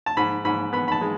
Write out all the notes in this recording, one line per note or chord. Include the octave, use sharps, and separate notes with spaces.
A5
G#2 B5
G#2 B5
B3 B5
B5
A5
G#3